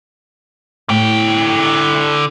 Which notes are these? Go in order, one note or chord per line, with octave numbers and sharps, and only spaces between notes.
A2 D3 G5